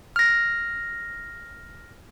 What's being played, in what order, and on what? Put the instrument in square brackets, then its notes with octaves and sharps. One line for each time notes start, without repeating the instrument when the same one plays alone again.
[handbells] F6 A#6